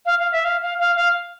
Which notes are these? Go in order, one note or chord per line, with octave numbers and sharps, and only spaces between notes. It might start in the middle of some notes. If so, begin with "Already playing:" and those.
F5
F5
E5
F5
F5
F5
F5